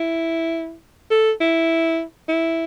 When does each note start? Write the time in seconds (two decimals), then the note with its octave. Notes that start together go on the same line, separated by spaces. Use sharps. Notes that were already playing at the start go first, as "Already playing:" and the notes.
Already playing: E4
1.11 A4
1.41 E4
2.28 E4